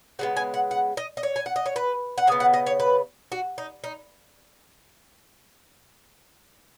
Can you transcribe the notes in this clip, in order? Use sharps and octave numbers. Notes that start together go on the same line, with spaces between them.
C#3 G#3 B3 F#5
G#5
F#5
F#5
D#5
D#5
C#5
G#5
F#5
D#5
C#5
B4
F#5
C#3 B3 G#5
F#5
D#5
C#5
B4
F#4
D#4
D#4